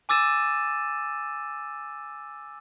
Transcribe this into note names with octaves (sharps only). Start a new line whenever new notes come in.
G#5 D6 E6 A6 D#7 E7